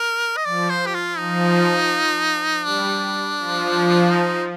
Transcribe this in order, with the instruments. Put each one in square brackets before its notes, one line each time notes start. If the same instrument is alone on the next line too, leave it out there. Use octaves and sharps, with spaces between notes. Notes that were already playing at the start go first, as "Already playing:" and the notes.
Already playing: [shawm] A#4
D#5
[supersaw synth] F3 [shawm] D5
[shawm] C5
G4
F4
[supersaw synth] F3 [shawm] D#4
[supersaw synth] G3 [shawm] D4
[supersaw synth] F3
[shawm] D#4